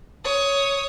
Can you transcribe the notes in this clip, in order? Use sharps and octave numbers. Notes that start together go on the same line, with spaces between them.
C#5 D#6